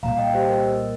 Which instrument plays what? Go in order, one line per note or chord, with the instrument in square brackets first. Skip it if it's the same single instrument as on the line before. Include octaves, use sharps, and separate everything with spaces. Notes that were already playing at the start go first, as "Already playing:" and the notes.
[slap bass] C2 A#2 G3 [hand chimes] F5 A#5
[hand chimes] D#5 G5
G4 C5
A#4 D#5